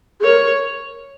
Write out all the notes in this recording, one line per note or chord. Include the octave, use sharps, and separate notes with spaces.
G#4
A#4 C#5